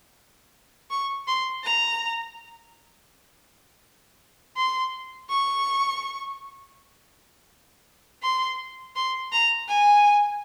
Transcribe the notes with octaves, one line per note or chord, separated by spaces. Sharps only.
C#6
C6
A#5
C6
C#6
C6
C6
A#5
G#5